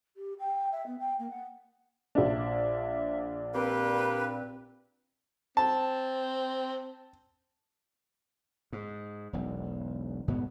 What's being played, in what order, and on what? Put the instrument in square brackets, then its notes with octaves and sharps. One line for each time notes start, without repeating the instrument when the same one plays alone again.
[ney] G4
G5
E5
B3
G5
A#3
F#5
[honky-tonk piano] A#1 D4 [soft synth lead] E5
[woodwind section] A#3 G4 B4 [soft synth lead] C4
[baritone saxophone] C4 [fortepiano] A5
[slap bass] G#2
E1 B1
G1 G#2 B2 B3